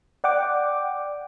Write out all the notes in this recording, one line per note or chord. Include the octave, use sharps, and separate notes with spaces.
D5 F#5 G5 D6